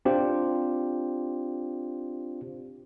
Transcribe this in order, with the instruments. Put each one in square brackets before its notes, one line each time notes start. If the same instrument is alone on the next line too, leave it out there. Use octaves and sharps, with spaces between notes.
[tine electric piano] C4 D4 F4 G4 C5